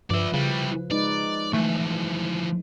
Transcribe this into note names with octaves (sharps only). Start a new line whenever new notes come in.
G2 F3 B4 D5 E5
C#3 G3 E4
G#3 D#4 B4 D5
E3 F3 A3